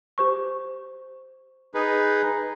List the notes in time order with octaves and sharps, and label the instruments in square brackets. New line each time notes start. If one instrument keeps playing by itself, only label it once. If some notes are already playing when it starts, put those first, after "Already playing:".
[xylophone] G4 C5 C#6
[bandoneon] D#4 G#4 B4